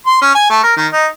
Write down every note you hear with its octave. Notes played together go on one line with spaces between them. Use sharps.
C6
C#4
G#5
A3
A#4
D#3
D#4